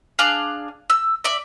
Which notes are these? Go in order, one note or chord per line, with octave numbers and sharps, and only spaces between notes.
D4 G#4 F5
E6
D5 E5